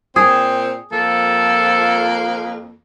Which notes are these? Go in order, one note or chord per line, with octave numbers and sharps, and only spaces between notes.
A#2 C4 G#4
F2 F3 A#3 A4